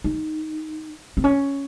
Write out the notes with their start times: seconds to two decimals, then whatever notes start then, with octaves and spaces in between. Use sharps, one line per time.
0.04 D#4
1.17 C4
1.24 C#4